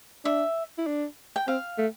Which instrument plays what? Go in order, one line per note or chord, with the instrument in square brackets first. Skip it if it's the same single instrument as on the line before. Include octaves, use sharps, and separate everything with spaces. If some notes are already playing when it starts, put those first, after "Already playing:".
[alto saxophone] D4 [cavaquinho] E5
[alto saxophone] E4
D4
[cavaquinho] G5
[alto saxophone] C4 [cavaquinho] F5
[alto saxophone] A3